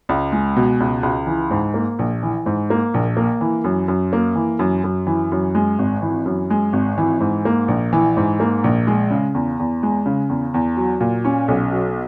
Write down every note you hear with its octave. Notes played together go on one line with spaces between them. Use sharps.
C#2
G#3
B2
C#2
C#2
E3
G#2
A#3
A#1
E3
G#2
A#3
A#1
A#3
E3
F#2
F#2
A#3
E3
F#2
F#2
E3
F#2
G#3
G#1
E3
F#2
G#3
G#1
E3
G#2
A#3
A#1
E3
G#2
A#3
A#1
G#3
C#3
E2
E2
G#3
C#3
E2
E2
F#3
A#2
C#4
B1
F#3